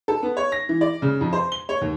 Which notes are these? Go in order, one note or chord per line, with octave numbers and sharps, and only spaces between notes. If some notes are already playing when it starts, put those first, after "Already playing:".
A4
B3
C#5
A#6
E3
D5
C#3
F2
C5
G7
C#5
D#2